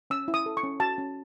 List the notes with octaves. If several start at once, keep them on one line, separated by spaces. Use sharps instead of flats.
C#4 E6
E4
D#6
A4
C#6
C#4
F#4 A5
C#4